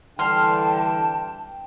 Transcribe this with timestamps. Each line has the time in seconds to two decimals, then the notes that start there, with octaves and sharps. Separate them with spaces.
0.19 D3 E3 G3 G5 A5 C6 F6